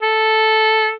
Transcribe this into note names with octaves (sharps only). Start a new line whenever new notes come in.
A4